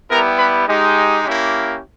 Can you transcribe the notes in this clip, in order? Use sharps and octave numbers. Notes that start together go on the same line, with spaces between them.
G3 B3 E4 G4 A#4 A#5
B4 B5
G#3 D#4 G4
A#3 C#4 E4 G4